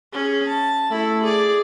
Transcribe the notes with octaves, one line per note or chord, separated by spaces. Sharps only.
C#4 G#4
A5
A3 E4 A4
G#4 D5